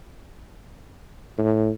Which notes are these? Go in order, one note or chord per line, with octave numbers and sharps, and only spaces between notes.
A2